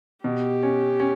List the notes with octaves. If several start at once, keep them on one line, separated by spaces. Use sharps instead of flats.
B2 G4
C#4
C#4